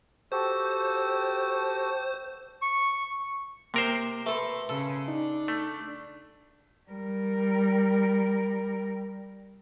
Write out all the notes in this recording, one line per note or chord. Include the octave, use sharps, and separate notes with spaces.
F#4 G4 A4 C5
C#6
C3 A#3 A#4 C5
A3 A4 B4 B5 C6
C#3 A4
D4 D#4
A3
G3 A#4